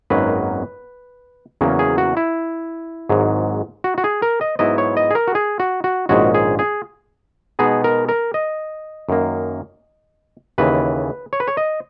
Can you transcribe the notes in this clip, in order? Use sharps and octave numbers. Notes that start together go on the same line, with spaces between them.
G#1 F#2 D#3 F#3 A#3 B4
E2 C#3 F#3 A#3 C#4
G#4
F#4
E4
G#1 G#2 F#3
F#4
F#4
G#4
A#4
D#5
G#2 F#3 B3 E4 D#5
C#5
D#5
G#4
A#4
F#4
G#4
F#4
F#4
A#1 G#2 D#3 G#3 C#4 F#4
G#4
G#4
B2 G#3 B3 D#4 G#4
A#4
A#4
D#5
F#2 D#3 A#3
D#2 C#3 E3 B4
C#5
B4
C#5
D#5